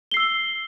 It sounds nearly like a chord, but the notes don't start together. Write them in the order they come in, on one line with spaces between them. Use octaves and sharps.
G7 C7 E6